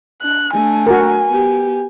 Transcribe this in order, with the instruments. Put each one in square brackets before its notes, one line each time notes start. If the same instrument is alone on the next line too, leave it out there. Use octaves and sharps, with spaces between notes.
[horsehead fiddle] D4 [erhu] F#6
[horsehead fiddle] A3 D4 [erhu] G#5
[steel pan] F#4 A#4
[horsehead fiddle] B3 G4